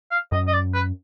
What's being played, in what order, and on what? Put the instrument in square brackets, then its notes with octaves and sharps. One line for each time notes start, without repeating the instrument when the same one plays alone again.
[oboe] F5
[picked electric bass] F#2 [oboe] D#5
[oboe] D#5
D5
B4